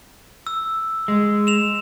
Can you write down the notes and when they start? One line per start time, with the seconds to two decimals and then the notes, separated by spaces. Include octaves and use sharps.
0.47 E6
1.08 G#3
1.47 E7 F7